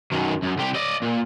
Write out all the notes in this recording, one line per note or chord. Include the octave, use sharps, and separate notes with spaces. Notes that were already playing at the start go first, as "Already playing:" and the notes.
F#2 D#3
F#2
C2 G4
D5 D#5
A#2